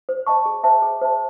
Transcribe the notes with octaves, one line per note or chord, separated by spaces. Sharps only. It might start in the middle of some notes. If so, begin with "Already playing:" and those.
C5
D#5 A5 C#6
G#4
C5 E5 A5
G#4
C5 E5 A5